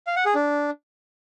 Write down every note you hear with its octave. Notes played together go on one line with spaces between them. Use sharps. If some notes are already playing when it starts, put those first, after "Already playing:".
F5
F#5
G#4
D4